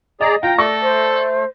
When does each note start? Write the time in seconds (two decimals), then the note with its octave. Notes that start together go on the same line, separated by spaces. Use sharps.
0.21 G#4 D5 D#5 A#5
0.43 F4 G5 A#5
0.58 A3 A4 D5 C#6 A#6
0.81 C5